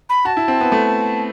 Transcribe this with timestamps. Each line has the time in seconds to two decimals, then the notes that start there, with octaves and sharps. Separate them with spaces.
0.09 B5
0.25 F#4 A5
0.37 E4
0.48 C4
0.61 B3
0.72 A3